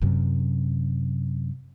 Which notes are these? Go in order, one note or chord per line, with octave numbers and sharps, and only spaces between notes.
F#2 C3